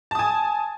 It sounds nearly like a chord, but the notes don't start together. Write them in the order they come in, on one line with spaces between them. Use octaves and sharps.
A5 D#6 G#5